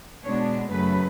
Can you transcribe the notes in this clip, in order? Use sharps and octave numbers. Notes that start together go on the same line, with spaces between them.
B2 G#3 B3 D4 C#5
F#2 C#3 F#3 A3 B4